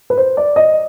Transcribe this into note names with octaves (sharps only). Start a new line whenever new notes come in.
B4
C5
D5
D#5